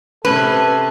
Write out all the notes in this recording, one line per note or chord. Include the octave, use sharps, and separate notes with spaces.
C3 C#4 A4 B4